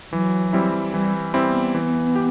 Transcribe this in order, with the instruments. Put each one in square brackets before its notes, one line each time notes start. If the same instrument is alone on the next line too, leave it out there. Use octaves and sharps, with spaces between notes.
[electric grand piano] E3 [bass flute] F#3
[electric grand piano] G3 C4 E4
[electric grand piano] E3 [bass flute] G3
[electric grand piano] G3 C4 E4
[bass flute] B3
[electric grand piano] E3
G4